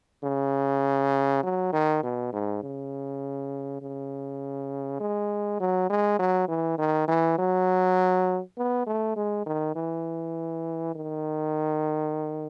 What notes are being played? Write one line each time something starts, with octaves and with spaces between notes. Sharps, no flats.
C#3
F#3
D#3
B2
G#2
C#3
C#3
G#3
F#3
G#3
F#3
E3
D#3
E3
F#3
B3
A3
G#3
D#3
E3
D#3